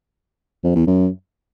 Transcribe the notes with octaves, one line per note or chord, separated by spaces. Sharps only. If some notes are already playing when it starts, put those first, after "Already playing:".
F2
E2
F#2